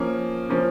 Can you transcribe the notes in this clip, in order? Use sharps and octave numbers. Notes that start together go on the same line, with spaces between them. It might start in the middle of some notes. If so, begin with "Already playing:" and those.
Already playing: F3 A#3 C#4
F3 A#3 C#4